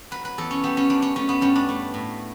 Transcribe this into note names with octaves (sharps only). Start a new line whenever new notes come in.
F#3 B4
B4
E2 A4
C#4
G3 B3
C#4
F#2 D4
C#4
A3 C#4
B3
G2 C#4
D4
A3
A2